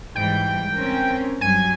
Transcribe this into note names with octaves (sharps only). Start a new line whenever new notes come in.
G#2 E3 G3 G5
C4 C#4 A#4
G2 F#3 G#5